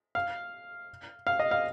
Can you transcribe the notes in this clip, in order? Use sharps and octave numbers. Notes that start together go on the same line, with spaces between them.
F5
F5
D#5
F5